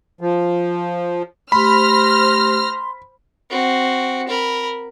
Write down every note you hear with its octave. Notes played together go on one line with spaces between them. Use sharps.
F3
A3 G4 C5 B5 C6 F6 A#6
C4 F#4
A#4 B5